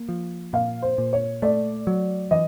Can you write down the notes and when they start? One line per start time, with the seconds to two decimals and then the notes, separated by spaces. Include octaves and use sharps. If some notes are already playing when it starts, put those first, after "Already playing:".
Already playing: A#3
0.09 F3
0.53 A#2 F5
0.82 C5
0.98 A#2
1.13 C#5
1.42 A3 D5
1.87 F#3
2.31 E3 D#5